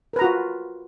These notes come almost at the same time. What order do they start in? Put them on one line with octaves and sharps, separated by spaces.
A#4 B4 A#5 F#4 F4